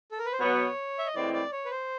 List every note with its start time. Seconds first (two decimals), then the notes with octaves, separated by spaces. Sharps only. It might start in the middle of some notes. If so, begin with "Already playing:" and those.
0.11 A4
0.19 A#4
0.25 B4
0.32 C5
0.40 B2 F#3 B3 C#5
0.99 E5
1.06 D#5
1.15 A2 E3 G#3 C4 D5
1.34 D5
1.52 C#5
1.65 B4
1.71 C5